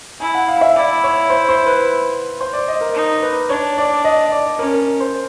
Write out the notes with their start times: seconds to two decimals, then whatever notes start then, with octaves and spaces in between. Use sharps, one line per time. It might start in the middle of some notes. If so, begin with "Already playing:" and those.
0.20 E4 G#5
0.35 F#5
0.48 F5
0.61 E5
0.76 E4 D5
1.04 C#5
1.30 C5
1.49 C5
1.66 B4
2.41 C5
2.53 D5
2.68 D#5
2.81 A#4
2.95 D#4
3.22 B4
3.50 D4 C#5
3.78 D5
4.04 D#5
4.32 D5
4.59 C#4 A#4
4.74 A#4
5.00 C5